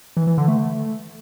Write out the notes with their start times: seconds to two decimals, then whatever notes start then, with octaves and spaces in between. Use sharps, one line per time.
0.17 E3
0.27 E3
0.38 D3
0.48 A3